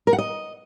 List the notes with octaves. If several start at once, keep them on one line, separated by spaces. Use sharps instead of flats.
A#4
F#5
D#5